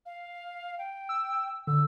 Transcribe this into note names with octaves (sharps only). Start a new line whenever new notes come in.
F5
G5
E6
D3 E6